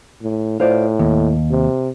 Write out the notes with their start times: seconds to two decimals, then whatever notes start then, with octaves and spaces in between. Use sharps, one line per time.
0.22 A2
0.60 A2 F4 C5 D5
0.99 D#2
1.51 C3